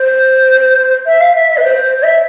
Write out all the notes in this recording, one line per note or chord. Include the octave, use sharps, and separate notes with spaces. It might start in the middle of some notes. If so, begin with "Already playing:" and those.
Already playing: C5
E5
F5
E5
E5
B4
C5
C5
E5